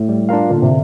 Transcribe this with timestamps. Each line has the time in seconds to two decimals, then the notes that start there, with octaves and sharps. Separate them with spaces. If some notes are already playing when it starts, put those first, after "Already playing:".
Already playing: A2
0.09 G3
0.29 D4 F4 A#4 F5
0.50 A#2 D3
0.62 C3